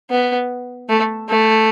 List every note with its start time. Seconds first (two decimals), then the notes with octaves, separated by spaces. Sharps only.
0.10 B3
0.89 A3
1.29 A3